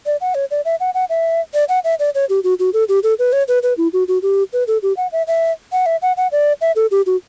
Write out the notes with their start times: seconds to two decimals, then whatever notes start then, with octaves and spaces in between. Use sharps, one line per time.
0.06 D5
0.21 F#5
0.35 C#5
0.51 D5
0.65 E5
0.80 F#5
0.94 F#5
1.10 E5
1.54 D5
1.69 F#5
1.84 E5
1.99 D5
2.15 C#5
2.29 G4
2.44 F#4
2.59 F#4
2.74 A4
2.89 G4
3.03 A4
3.19 B4
3.33 C#5
3.48 B4
3.63 B4
3.77 E4
3.93 F#4
4.08 F#4
4.22 G4
4.53 B4
4.67 A4
4.83 G4
4.97 F#5
5.12 E5
5.27 E5
5.72 F#5
5.86 E5
6.02 F#5
6.17 F#5
6.32 D5
6.61 E5
6.76 A4
6.91 G4
7.06 F#4